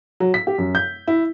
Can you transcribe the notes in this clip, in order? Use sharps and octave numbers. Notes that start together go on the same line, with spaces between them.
F#3
B6
G4
F#2
G6
E4